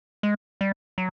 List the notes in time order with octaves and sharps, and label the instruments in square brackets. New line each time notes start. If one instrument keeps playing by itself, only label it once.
[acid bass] G#3
G3
F#3